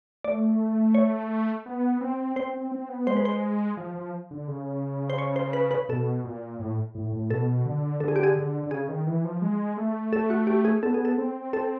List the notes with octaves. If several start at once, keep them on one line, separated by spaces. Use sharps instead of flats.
A3 D5
C#5
B3
C4
C4 C5
C4
C4
B3
G#3 C5
B4
C5
F3
F3
D3
C#3
C5
C#5
C5
B4
B4
B2 A4
A#2
A2
A2
A2
B2 A4
D3
D3 A4
G#4
G4
G#4
D3
D3
C#3 G#4
D#3
E3
F3
G#3
A3
A4
F#4
G4
G#4
B3 A4
G#4
A4
C4
A4